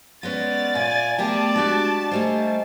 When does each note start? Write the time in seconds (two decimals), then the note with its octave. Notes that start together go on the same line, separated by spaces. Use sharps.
0.23 G#3 B3 C#4 D5 A6
0.75 A#2 E5 G#5
1.18 A3 B3 G4 G#4 A#4 D5 G5 A5
1.56 G#3 D4 F#4 G4
2.11 G3 A3 A#3 C5 D#5 G#5